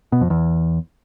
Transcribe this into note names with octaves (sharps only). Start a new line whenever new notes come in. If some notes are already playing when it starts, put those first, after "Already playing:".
B2
F2
E2